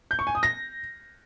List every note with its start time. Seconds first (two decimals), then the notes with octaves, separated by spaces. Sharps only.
0.11 G6
0.19 C#6
0.27 G#5
0.35 D#6
0.43 A#6